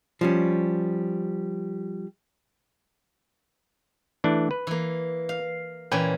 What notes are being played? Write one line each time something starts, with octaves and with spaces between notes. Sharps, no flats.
F3 G3 C#4
E3 A3 D4
B4
E3 A#3
F5
A#2 E3 C#4 B4 G5 G#5